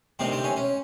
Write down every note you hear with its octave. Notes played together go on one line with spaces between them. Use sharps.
D2 C3 D#3 C4
C4
C#4
C#4